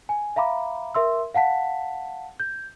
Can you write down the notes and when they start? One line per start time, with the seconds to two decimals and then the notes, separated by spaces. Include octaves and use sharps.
0.09 G#5
0.36 E5 F5 A#5 B5 D6
0.95 A#4 E5 C6 E6
1.34 F5 F#5 A5 B6
2.40 G6